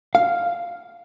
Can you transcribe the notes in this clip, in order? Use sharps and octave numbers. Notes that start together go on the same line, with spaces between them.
F5